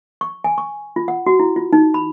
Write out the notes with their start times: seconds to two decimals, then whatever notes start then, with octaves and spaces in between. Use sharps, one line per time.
0.21 C#6
0.44 G#5
0.58 C#6
0.96 F4
1.08 F#5
1.27 F#4
1.39 E4
1.56 F4
1.73 D#4
1.94 B5